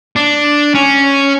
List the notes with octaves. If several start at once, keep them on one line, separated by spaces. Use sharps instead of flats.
D4
C#4